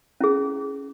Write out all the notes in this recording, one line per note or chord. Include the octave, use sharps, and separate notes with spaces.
C#4 E4 G#4